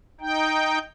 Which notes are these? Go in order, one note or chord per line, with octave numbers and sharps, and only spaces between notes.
D#4 G5